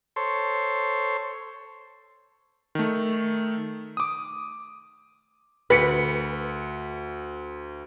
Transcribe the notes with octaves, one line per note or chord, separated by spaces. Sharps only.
A4 C5 C#5 C6
D#3 A3
D6 D#6
D2 B4 C#7